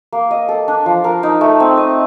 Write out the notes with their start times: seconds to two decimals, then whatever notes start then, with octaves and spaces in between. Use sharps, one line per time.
0.12 A#3
0.31 D#5
0.49 A4
0.68 D4
0.86 F3
1.04 A#4
1.23 D#4
1.41 A3
1.60 C4
1.78 D#5